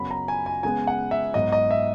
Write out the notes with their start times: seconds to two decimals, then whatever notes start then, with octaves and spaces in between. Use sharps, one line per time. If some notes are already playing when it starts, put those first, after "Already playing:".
Already playing: F#2 C#3 F#3 B3 B5
0.11 A#5
0.28 G#5
0.46 G#5
0.63 C#3 G#3 B3 G#5
0.87 F#5
1.11 E5
1.34 G#2 F#3 B3 D#5
1.52 D#5
1.71 E5